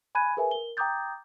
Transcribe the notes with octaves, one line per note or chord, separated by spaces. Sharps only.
G#5 B5 F#6 G#6 D#7
G#4 A#4 B4 E5 G#5
A#4 G7
G5 A#5 D6 D#6 G6 A6